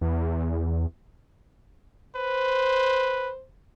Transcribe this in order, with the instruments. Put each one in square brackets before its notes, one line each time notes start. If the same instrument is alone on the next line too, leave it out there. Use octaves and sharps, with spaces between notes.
[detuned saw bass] E2
[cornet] B4 [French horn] C5